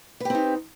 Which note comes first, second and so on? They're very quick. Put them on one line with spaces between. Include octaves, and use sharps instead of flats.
B4 G4 C4 D#4